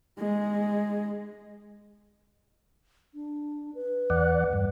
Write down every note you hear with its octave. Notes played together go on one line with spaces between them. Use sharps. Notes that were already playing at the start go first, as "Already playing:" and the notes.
G#3
D4
B4
E2 D5 F#5
G2